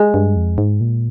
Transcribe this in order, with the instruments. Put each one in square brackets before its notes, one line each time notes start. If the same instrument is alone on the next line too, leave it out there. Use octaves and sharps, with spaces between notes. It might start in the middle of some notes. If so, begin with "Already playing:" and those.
Already playing: [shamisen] G#3
[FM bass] G2
F2
G#2
A#2